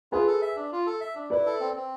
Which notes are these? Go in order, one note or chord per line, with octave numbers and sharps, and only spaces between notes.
F4 G#4 B4
A4
E5
D4
F4
A4
E5
D4
E4 B4 D5
A4
C4
C4